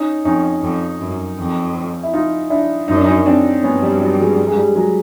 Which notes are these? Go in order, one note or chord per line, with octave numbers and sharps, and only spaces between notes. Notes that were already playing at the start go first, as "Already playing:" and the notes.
Already playing: C#4 D#4
F2 C#4 D#4
F2
F#2
F2
E4
D#4 F4
D4 E4
F#2 D#4
D4
C#4 D#4
C4 D4
G2 B3 C#4
G3
F#3
G3
F#3 G#3
G#3
G3
F#3 G#3